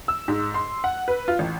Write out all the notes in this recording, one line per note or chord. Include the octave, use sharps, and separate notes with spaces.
E6
G#2
C6
F#5
B4
F4
A1